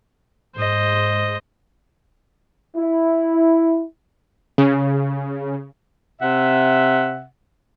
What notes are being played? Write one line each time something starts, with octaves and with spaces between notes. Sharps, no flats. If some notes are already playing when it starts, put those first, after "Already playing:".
G#2 C5 D#5
E4
C#3
C3 E5 F#5